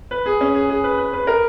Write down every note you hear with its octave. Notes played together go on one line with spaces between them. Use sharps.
B4
G#4
C#4
G#4
G#4
B4
B4
B4
A#4